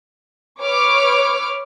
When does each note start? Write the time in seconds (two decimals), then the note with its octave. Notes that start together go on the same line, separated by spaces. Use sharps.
0.59 B4 C#5 D6 F6